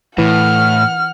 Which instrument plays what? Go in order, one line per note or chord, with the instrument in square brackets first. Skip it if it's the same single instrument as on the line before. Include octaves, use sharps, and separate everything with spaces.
[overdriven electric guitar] A2 [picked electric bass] E3 [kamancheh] F#5 F6